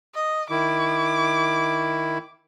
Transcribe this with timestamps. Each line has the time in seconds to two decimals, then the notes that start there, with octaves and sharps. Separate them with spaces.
0.15 D#5
0.50 D#3 E4 D6